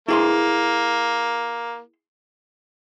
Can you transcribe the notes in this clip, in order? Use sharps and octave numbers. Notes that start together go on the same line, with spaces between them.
A#3 E4 G#4 C6